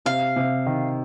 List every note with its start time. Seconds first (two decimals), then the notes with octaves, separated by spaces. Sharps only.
0.06 C3 F5
0.36 C3
0.67 D#3